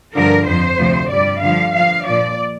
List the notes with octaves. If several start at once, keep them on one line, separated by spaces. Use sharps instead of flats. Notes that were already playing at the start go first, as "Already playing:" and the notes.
G2 D3 F3 A#4
F2 F3 C5
D2 C3 F3
G2 G3 D5
G2 D3 F3 F5
G2 F3 F5
A#2 F3 D5